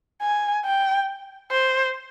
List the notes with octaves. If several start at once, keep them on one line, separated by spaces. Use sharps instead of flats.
G#5
G5
C5